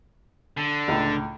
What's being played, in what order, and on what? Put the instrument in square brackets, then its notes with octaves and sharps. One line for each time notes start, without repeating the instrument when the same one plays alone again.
[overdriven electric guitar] D3
[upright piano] C#2 A2